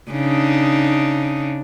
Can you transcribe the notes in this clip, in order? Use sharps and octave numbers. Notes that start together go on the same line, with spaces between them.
C#3 D4 D#4